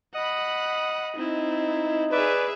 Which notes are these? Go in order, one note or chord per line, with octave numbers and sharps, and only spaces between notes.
D#5 F#5 B5
C4 D#4 E4
G#4 B4 D5 E5